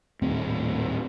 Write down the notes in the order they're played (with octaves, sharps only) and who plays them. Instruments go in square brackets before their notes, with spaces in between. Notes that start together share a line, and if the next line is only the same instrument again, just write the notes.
[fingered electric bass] D#1 A2 C4